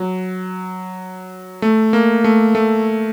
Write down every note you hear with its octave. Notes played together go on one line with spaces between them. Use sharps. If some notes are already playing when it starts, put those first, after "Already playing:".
Already playing: F#3
A3
A#3
A3
A3